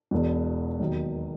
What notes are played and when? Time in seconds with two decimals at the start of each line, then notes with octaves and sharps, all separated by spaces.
0.11 E1 E2 B2
0.80 D#2 D#3 F#3 B3